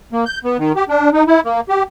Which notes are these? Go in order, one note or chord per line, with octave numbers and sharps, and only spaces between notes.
A#3
G6
B3
D#3
G4
D4
D#4
E4
A#3
G4